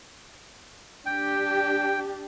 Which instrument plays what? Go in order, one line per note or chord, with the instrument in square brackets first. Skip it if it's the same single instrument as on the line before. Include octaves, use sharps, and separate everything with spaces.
[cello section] D4 G4 [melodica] G5